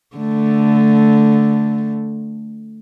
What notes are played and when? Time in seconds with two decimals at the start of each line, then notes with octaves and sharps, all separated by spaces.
0.16 D3 A3